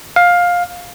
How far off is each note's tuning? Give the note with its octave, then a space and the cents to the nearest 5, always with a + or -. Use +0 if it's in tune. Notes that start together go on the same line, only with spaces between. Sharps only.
F5 +15